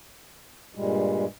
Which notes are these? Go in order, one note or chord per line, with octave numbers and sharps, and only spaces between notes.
G2 A#2 G3 G#3